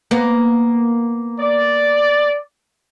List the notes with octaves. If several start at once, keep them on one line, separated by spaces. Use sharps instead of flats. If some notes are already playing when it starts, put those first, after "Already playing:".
A#3 B3
D5